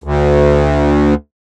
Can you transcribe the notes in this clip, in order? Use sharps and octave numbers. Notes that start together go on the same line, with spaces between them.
D2